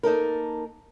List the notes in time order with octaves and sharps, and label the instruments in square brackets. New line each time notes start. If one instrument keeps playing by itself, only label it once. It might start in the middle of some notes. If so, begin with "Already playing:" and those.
[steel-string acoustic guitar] A#3 D#4 A4 A#4